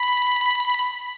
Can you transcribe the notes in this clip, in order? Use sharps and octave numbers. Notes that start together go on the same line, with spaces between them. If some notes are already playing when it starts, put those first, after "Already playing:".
Already playing: B5